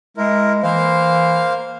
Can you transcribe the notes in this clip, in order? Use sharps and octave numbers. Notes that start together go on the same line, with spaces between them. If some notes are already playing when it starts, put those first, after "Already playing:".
G#3 E4 A#4
E3 A#3 C5 F5